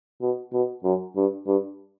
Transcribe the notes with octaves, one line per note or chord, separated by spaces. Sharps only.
B2
B2
F#2
G2
G2